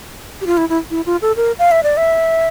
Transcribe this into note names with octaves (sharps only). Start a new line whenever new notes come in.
G4
F4
E4
E4
E4
F4
A4
A#4
F5
E5
D5
E5